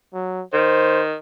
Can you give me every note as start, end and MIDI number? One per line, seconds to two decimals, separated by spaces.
0.14 0.44 54
0.53 1.15 51
0.53 1.03 72